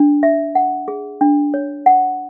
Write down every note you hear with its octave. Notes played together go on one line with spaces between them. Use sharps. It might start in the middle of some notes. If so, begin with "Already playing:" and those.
Already playing: D4
E5
F#5
G#4
D4
C#5
F#5